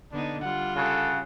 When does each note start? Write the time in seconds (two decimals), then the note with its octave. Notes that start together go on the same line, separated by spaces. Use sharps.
0.12 D3 B3 D4 D#4
0.41 G3 F4 F#5
0.76 C#3 A4 F#5